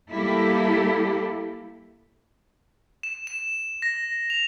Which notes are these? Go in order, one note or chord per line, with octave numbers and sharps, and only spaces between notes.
G3 A#3 E4 G4 A4
E7
E7
A#6
F7